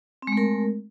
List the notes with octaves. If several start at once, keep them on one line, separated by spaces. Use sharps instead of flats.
G#3 A3 C4 A#4